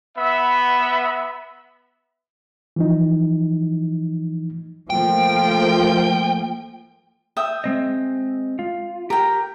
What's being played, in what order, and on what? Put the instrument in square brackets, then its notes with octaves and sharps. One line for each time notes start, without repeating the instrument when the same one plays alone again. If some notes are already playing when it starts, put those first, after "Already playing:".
[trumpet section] B3 E5 F#5 B5
[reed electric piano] E3 F3 D#4
[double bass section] F3 A3 A#3 [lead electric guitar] G5
[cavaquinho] E5 G5 D#6
[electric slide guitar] G#3 C4 D#5
F4
[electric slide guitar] G4 [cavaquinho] A#4 G5